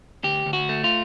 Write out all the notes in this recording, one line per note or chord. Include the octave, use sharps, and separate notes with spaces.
D2 G4
D2
F#4
A3
F4